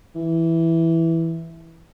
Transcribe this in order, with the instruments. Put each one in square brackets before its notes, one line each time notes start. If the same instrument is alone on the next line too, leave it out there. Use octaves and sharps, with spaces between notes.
[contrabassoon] E3